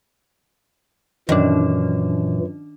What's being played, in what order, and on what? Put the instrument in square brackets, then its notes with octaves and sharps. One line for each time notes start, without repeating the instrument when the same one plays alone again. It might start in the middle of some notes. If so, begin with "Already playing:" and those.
[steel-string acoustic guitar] F#2 [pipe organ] A#2 E3 [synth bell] D#3 D4